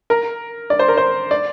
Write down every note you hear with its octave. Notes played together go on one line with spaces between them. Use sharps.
A#4
D5
C5
A#4
C5
D5